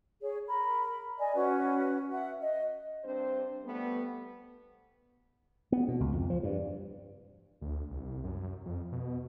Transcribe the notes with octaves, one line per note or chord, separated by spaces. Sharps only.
G#4 C#5
A#4 B5
D5 D#5 G#5
C#4 F#4 B4 F#5
E5 F#5
D#5
G2 C4 D4 C5
G3 A3 B3
B3
B2
C#2
F2
F3
G2
D2
C2
F#2
F2
B2